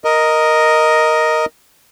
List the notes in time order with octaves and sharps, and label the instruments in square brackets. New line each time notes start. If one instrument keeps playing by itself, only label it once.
[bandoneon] A#4 D#5